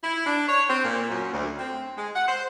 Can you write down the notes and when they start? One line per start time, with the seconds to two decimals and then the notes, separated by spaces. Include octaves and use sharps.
0.04 E4
0.26 D4
0.48 C#5
0.69 C4
0.85 A#2
1.10 F#2
1.32 D2
1.59 C4
1.97 G#3
2.15 F#5
2.28 C5